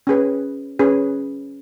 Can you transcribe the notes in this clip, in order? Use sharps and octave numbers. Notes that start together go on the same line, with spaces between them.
C#4 G#4 B4
C#4 G#4 B4